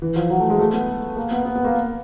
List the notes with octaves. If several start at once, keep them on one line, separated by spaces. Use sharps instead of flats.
E3
F3
F#3
A3
G#3
A3
B3
A#3
B3
B3
B3
A#3